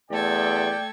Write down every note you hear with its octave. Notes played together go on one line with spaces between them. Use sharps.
E2 A3 A4 D5 G5 G#6